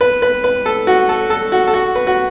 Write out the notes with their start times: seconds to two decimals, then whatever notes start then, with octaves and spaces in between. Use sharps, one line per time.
0.01 B4
0.22 B4
0.44 B4
0.66 A4
0.87 F#4
1.09 A4
1.30 A4
1.52 F#4
1.67 A4
1.74 F#4
1.95 B4
2.07 F#4